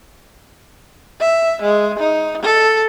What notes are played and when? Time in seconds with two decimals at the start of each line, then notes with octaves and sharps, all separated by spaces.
1.20 E5
1.62 G#3
1.99 D#4
2.43 A4